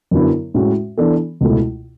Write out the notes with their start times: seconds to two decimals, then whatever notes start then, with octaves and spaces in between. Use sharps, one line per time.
0.11 F#2 D3 F#3 B3 E4
0.54 A2 G#3 C#4 F#4
0.97 E3 B3 D4 A4
1.41 C#2 B2 A3 E4